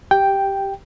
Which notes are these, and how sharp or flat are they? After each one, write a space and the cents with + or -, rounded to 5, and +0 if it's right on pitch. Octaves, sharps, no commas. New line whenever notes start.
G4 -5 G5 +0